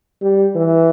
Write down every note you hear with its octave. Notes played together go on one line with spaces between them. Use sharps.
G3
E3